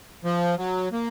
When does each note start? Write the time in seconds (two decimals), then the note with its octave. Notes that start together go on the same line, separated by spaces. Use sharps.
0.24 F3
0.58 F#3
0.92 A#3